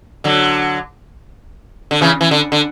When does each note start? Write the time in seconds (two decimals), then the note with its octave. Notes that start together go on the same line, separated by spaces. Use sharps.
0.24 D3 F#3
1.91 D3
2.01 C#3 E3
2.21 E3
2.31 D3
2.52 D3